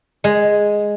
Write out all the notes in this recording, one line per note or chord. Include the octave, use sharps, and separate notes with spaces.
G#3